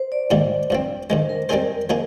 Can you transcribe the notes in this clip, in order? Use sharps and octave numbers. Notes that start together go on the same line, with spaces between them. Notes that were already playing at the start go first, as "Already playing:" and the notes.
Already playing: C5
D5
G#2 D#3 G3 A#3 C5
G2 F3 C4
G2 D#3 G#3 C5
A#4
G3 C4 D#4 G#4 A#4 C5
F3 A#3 D#4 G#4